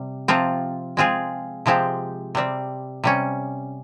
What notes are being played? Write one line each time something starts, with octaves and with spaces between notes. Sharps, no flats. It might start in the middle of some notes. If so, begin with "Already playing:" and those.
Already playing: C3 G3
C3 F3 C4 F4
G#3 C4 F4 G#4
C3 F3 G#3 C4 G4
C3 G3 C4
C3 G3 C#4